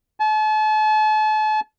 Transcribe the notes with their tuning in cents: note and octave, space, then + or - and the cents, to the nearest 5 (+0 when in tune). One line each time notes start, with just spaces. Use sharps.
A5 -40